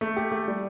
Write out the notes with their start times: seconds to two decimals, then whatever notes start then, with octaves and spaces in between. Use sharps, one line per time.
0.01 A3
0.16 G4
0.31 A3
0.48 G3